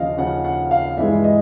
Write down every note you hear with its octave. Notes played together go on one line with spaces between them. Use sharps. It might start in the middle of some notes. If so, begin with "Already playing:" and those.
Already playing: D#2 C#3 F3 D#5 F5
D#2 C#3 F3 F#5
F#5
F5
G2 E3 G#3 E5
D#5